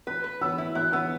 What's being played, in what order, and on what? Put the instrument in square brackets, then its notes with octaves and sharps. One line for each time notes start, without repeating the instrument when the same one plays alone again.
[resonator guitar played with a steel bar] B4 [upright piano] F#6
[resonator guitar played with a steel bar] B4
[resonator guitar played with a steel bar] B3 [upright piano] E6
[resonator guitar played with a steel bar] E4
[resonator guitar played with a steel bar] E4 [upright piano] F#6
[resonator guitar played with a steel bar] B3 [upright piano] E6